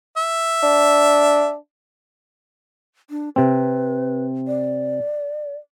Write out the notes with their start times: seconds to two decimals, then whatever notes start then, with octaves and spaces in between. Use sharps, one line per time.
0.17 E5
0.62 D4
3.10 D4
3.36 C3 C4 B4
4.47 D5